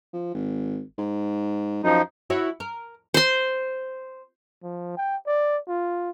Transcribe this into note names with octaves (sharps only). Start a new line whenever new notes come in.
F3
G#1
G#2
F#2 F3 D#4
E4 F#4 C#5
A#4
C5 C6
F3
G5
D5
F4